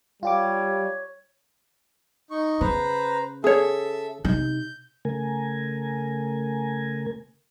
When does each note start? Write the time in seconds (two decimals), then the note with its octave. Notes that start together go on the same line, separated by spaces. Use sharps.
0.23 G3 F4 G4 C#5 D6
2.31 D#4 C#6
2.61 C#3 B4 C5 A#5
3.44 G#4 A4 C#5 E5
4.25 C3 D#4 G6
5.05 C#3 A3 A#4 G#5